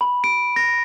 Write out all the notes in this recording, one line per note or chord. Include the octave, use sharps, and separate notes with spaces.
B5
D7
A#6